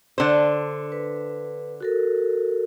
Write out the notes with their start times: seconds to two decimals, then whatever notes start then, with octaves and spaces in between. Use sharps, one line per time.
0.18 D3 C5
0.92 B4
1.80 F#4 A4 A#4